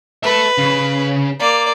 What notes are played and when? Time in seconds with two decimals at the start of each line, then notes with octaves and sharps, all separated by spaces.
0.23 A4 B4 E5
0.58 C#3
1.40 A#3 D5